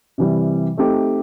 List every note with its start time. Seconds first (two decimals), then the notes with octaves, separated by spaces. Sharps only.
0.18 C3 E3 G3
0.78 A3 C4 D#4 G4